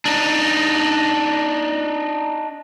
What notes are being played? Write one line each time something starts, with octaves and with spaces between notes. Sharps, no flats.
D4 D#4